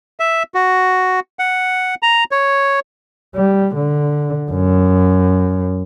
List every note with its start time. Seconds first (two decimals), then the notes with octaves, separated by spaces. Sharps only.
0.20 E5
0.54 F#4
1.39 F#5
2.03 A#5
2.31 C#5
3.36 G3
3.76 D3
4.51 F#2